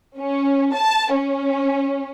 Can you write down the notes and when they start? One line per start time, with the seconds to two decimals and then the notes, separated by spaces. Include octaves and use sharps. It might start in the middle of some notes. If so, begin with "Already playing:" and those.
0.18 C#4
0.74 A5
1.15 C#4